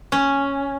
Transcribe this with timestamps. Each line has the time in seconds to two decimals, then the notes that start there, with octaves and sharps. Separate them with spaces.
0.12 C#4